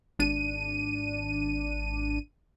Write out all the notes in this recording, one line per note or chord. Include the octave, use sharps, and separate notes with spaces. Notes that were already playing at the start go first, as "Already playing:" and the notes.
G#1 D4 D#7